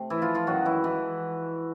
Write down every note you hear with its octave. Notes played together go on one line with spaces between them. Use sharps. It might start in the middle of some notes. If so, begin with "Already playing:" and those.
Already playing: C3 A3
E3 E4
F3 F4
F3 F4
F#2 D#3 F#3 G#3 F#4
E3 E4
E3 E4